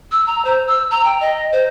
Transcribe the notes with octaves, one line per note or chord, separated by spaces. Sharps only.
E6
A#5
C5
E6
A#5
G5
D#5
C5